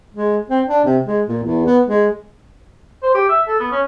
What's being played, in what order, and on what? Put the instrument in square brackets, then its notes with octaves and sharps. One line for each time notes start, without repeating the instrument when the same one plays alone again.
[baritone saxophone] G#3
C4
D4
C3
G#3
A#2
E2
B3
G#3
[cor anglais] C5
G4
E5
A4
B3
C#4